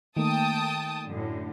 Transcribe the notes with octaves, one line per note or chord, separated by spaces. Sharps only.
D#3 A3 A#3 G5 A5 D#6
F#2 A2 D3